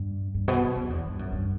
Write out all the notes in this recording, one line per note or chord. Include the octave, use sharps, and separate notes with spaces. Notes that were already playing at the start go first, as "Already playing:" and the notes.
Already playing: G2
G2
B2
F#2
F#2
E2
G2
F#2
G2